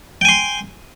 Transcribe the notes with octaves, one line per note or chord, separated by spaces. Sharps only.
G5 G#5 C6